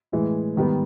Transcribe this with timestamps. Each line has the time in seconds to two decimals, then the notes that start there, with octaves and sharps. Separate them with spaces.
0.12 A2 E3 G#3
0.56 G#2 D#3 G3 B3